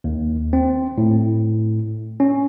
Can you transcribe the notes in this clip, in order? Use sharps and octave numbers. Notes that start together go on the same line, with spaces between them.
D#2
C4
A2
C#4